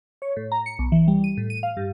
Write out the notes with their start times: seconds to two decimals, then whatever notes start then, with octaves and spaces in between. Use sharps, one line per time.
0.22 C#5
0.36 A2
0.52 A#5
0.66 C#7
0.79 B1
0.92 E3
1.08 G3
1.24 D#7
1.37 A2
1.50 D#7
1.63 F5
1.77 G2